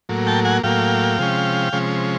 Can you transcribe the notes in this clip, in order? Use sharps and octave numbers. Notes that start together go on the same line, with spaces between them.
A2 F#3 A#3
G5 A5
F#5 G#5
A2 F#3 A#3 F5 G5
C3 F3 G#3 C#4
C3 F3 G#3 C#4